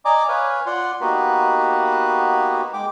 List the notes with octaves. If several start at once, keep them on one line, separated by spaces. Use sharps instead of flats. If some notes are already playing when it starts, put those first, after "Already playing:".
D5 D#5 G#5 A#5 D6
B4 C#5 F5 G#5
F4 D5 F#5 C6
A#3 B3 D#4 F#4 G4 B4
G#3 G5 D6